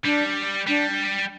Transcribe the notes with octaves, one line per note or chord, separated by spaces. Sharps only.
G3 D4
G3 D4